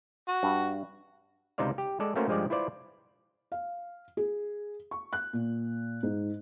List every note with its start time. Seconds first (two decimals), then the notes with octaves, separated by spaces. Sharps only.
0.28 F#4
0.43 G2
1.58 C#2 C3 D#4 C5 D5 F5
1.78 G4
2.00 G#3 A4 D5
2.16 A3 A#3 C#4 F#4 A#4 C5
2.28 G2 F3 G#3 G4 D5
2.50 E4 F4 B4 C5 D5
3.52 F5
4.17 G#4
4.91 C#6
5.13 F#6
5.33 A#2
6.03 G#2